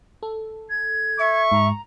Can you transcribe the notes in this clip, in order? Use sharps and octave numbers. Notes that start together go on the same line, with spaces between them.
A4
G#6
E5 C#6
G#2 A#5